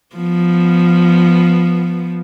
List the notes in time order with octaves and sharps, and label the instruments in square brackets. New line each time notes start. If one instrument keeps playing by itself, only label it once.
[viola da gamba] F3 B3